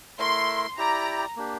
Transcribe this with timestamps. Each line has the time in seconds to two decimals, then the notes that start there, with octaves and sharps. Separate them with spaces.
0.18 A3 E4 A#4 E5 C6
0.78 E4 G4 D5 G5 A#5
1.37 A#3 D4 G4